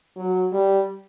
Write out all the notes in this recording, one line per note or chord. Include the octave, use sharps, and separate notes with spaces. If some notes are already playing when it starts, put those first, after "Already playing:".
F#3
G3